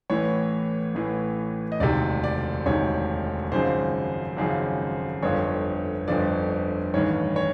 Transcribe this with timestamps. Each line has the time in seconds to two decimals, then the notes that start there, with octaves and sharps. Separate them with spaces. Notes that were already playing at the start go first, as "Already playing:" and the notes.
0.10 A1 A2 E3 C#5
0.95 A1 A2 E3
1.72 D#5
1.80 E1 D2 C3 D#3 D5
2.24 D5
2.66 E1 D2 C3 D#3 C#5
3.51 G#1 F#2 C#3 F3 C5
4.37 G#1 F#2 C#3 F3
5.22 G1 F2 D3 F3 C#5
6.08 G1 F2 D3 F3 D5
6.94 A1 G2 D#3 C#5
7.36 C#5